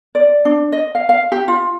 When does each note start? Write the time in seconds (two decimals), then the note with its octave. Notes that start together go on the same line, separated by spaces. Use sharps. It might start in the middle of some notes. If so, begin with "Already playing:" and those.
0.15 D5
0.45 D4
0.72 D#5
0.95 F5
1.09 F5
1.32 G4
1.48 F4